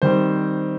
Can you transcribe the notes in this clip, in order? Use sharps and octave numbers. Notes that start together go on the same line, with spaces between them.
D#3 G3 C4 C5